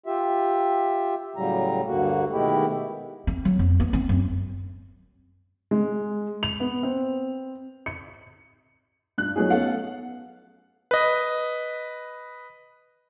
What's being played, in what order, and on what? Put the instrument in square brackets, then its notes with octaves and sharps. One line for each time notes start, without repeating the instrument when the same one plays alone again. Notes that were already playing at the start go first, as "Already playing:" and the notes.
[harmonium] F4 G4 E5
A2 C#3 F#3 G3 A#5
D2 G2 D3 A#3 F#4
B2 D#3 G#3 A3 E4 G4
[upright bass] C4
F#3
F2
B3
C4
F#2
[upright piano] G#3
F7
B3
C4
C#7
[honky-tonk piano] G2 F#6
F3 F#3 A3 B3 D#4 G#4
B3 C#4 A4 F5 F#5
[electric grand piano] B4 D#5